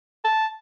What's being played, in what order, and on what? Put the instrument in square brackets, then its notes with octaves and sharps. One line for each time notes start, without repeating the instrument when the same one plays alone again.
[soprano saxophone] A5